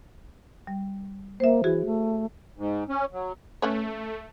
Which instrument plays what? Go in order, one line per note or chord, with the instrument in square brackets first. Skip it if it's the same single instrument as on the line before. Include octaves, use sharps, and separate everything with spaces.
[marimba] G3
[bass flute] A#3 [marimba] C5 E5
[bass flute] E3 [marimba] F#4 G#4
[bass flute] A3
[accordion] G#2
C#4
F#3
[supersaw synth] A3 [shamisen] C#4 B4 C#5